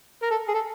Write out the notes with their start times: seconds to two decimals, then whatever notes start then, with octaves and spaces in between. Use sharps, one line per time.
0.23 A#4
0.31 A4
0.48 G#4
0.54 A4